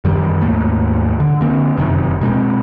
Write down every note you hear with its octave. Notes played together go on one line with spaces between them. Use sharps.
F#2 D#3 E3 G3
D#2 G#2 A3 A#3
D3
D3 A#3 C4
F1 F#2 C3 D#3
B2 G#3 B3 C4